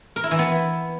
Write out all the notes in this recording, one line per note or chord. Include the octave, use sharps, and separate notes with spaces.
A#4
E4
E3
B3